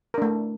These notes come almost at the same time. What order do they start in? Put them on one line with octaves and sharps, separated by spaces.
A#4 D4 A3